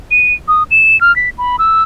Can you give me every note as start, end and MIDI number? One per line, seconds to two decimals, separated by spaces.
0.11 0.34 99
0.48 0.63 87
0.71 0.99 100
1.01 1.14 89
1.16 1.29 95
1.38 1.56 83
1.59 1.83 88